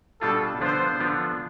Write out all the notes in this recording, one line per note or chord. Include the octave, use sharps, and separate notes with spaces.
B2 G3 D4 F4 A4
D3 F3 B3 D4 F4 C5
D3 F3 B3 D4 F4